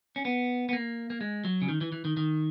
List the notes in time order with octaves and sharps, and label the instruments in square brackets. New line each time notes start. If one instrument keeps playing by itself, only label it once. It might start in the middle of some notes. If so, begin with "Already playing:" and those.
[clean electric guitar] C#4
B3
B3
A#3
A#3
G#3
F#3
C#3
D#3
E3
E3
D#3
D#3